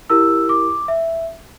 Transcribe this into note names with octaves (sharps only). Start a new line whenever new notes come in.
E4 G4 A#4 E6
D6
E5